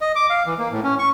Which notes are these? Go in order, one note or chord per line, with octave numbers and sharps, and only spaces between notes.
D#5
D6
F5
E3
A#3
A2
C#4
C#6